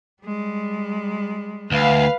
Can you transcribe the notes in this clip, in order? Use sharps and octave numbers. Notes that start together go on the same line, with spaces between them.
G3 G#3
D2 B4 F5